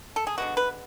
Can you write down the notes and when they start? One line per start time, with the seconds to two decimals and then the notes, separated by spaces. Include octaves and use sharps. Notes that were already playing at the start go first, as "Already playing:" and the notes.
0.16 A4
0.27 G#4
0.38 D3 G#3 B3 F#4
0.57 B4